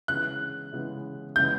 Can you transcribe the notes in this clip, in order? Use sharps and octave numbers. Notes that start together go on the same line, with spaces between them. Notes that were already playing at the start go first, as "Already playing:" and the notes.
C#3 E3 G#3 B3 F#6
C#3 E3 G#3 B3
C#3 E3 G#3 B3 G6